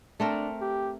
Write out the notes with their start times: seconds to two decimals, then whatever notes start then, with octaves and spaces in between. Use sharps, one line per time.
0.20 A3 C4 D4 A#4
0.61 G4